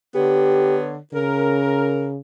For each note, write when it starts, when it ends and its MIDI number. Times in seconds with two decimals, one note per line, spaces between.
0.15 0.95 50
0.15 0.95 59
0.15 0.78 67
0.15 0.95 73
1.14 2.19 49
1.14 2.08 70